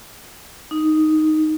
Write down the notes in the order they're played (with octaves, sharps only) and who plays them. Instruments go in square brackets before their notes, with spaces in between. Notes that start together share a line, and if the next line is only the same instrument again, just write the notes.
[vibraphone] D#4